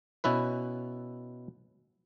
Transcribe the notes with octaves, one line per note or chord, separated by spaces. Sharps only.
B2 C#4 E4 B4